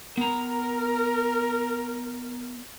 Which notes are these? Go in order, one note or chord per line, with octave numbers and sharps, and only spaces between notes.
B3 A#4 A#5